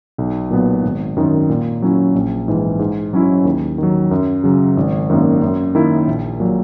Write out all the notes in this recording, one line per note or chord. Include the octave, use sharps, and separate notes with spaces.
B1
A#2 F#3 B3
G#1
F#2 D#3
A#2
F#3 C#4 E4
A#1
G#2 E3
G#2
F#3 C#4 E4
D#2
D#3 F#3
F#2
C#3 F#3
G#1
F#2 D#3 A#3
F#2
D#3 A#3 E4
A#1
A#2 F#3